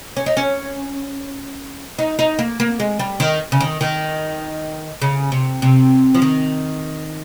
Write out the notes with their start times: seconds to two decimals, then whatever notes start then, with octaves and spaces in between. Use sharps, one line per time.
0.17 C#4
0.26 D#4
0.37 C#4
1.99 D#4
2.19 D#4
2.39 A#3
2.60 A#3
2.80 G#3
2.99 G3
3.20 D#3
3.52 C#3
3.61 D#3
3.81 D#3
5.02 C#3
5.32 C3
5.62 C3
6.15 F3
6.22 D#3